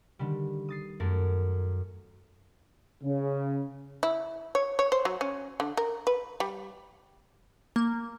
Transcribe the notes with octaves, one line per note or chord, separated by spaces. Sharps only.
D3 D#3 G3
D#6 A6 C7
F#2 A3 G#4 A#4 A6
C#3
E4
C#5
C#5
C5
F#3
C#4
D3
A#4
B4
G3
A#3